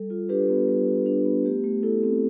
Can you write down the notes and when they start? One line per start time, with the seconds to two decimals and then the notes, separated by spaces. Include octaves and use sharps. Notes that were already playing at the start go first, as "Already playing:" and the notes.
Already playing: G3 A4
0.10 F4
0.29 D4 G4 B4
0.49 B3
0.68 G3
0.88 F4
1.06 D4
1.25 B3
1.44 A3 G4
1.64 A3
1.83 E4 A4
2.03 C4